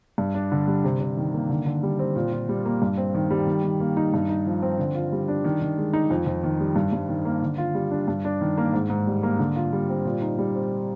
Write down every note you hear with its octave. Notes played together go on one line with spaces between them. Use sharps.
G2
D4
D3
G3
C3
C3
D#3
A#3
D3
D3
G3
C4
A#2
F4
G3
A#3
G2
C4
D#3
G3
D#3
D#3
A#3
D#4
G2
D#4
F3
C4
D3
F4
G3
D4
D#3
D#3
G#3
D#4
F2
F2
D#3
G3
G2
G2
D#3
A#3
D3
F4
G3
D4
G2
D4
D#3
A#3
G#2
G#2
G3
A#3
D3
F4
G3
C4
A#2
D#4
G3
C4